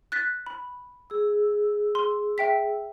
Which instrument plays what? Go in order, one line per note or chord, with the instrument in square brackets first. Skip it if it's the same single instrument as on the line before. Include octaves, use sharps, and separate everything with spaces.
[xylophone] F#6 A6 B6
B5
[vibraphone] G#4 E6
[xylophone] C6
E5 G5 B6